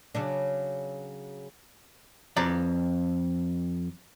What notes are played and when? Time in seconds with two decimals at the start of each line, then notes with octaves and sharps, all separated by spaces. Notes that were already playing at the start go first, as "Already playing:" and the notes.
0.15 C#3 F#3 D4
2.36 F2 D5 A#5